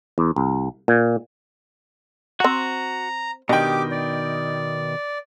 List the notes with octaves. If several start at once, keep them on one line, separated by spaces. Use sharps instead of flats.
E2
C2
A#2
C4 F#4 F#5 A#5
B2 D#3 D4 G4 D#5 G5 D6
D5